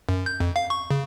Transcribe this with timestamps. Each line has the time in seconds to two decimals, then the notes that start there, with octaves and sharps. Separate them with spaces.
0.09 F#2
0.26 G6
0.40 F2
0.56 F5
0.70 C#6
0.91 C#3